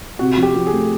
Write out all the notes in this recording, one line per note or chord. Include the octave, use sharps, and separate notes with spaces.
C3 F#4
F3
G4
F3
G#4
A3